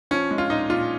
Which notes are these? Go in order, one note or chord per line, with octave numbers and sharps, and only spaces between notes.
F3 C#4
G#3
F4
A#2 D#4
A#2 F4